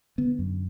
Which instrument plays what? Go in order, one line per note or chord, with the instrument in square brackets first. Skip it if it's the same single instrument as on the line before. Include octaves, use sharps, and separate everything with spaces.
[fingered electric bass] D3 B3
F#2